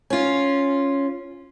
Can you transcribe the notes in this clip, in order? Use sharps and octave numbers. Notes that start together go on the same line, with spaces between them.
C#4 F4